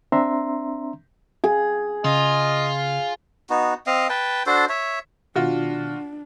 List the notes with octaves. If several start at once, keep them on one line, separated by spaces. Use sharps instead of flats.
C4 D4 E5 A#5 C6
G#4
C#3 F4 D#5
B3 D#4 F#4
C4 D#5 F5
B4 G5 A5
D4 F#4 A4 C5
C#5 E5
B2 D#3 D4 F4 F#4